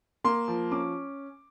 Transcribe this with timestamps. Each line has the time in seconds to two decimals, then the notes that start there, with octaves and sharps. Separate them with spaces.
0.24 A#3 C6
0.48 F3
0.71 C#4 D6